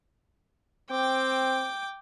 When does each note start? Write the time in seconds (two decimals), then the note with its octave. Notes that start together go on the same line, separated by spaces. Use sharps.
0.91 C4 G5 D6